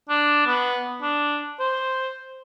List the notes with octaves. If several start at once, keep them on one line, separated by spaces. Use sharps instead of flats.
D4
B3
D4
C5